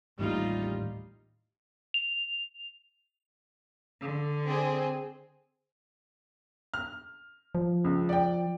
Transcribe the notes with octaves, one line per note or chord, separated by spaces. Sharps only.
A1 D#2 A2 G3 D#4 F4
F7
D3
C4 G#4
F6
F3
C#2
D5 G5